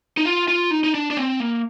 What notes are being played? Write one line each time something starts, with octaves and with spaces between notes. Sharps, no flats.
D#4
F4
F4
D#4
D#4
D4
D4
C4
A#3